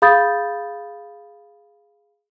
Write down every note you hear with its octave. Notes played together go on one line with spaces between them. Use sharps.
G#4 F5 B5 D#6 G6 A6